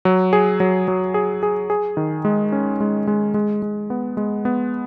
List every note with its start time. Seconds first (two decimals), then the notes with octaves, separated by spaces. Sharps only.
0.05 F#3
0.33 G#4
0.60 F#3
0.88 F#3
1.14 G#4
1.43 G#4
1.70 G#4
1.97 D#3
2.25 G#3
2.52 C#4
2.80 G#3
3.07 G#3
3.34 G#3
3.62 G#3
3.90 B3
4.17 G#3
4.45 B3